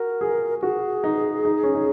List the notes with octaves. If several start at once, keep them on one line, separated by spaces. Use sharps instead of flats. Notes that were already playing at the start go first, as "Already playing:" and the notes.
Already playing: F#4 A#4
G#4
F#4 G#4
D#4
D#4
C#4
D#4